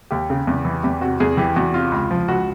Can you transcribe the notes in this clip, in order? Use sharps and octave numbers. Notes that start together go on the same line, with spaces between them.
D#2 G4
C#3
E2
E3
E2 G4
C3 F#4
E2 G#4
E3 G4
E2 F#4
C3 F4
C#2
F3
C#2 F#4